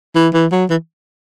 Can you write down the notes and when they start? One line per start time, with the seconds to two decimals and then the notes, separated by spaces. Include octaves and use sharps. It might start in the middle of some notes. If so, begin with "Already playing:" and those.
0.15 E3
0.34 E3
0.52 F#3
0.70 E3